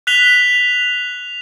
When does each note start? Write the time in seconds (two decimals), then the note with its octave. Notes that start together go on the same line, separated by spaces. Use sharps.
0.07 F#6 B6 F7 G7